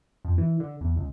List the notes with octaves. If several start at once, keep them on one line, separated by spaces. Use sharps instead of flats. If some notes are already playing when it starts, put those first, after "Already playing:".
F2
E3
D3
E2
C#2